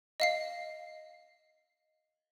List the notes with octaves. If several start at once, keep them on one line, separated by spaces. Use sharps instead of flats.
D#5 F5 C7